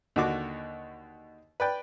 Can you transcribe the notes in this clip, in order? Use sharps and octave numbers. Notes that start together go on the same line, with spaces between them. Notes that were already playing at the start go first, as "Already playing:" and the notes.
D#2 D3 F#4 D6
B4 D5 G5